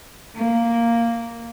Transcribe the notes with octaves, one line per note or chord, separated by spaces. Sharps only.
A#3